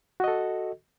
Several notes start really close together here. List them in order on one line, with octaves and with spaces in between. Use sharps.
F#4 D#5 A4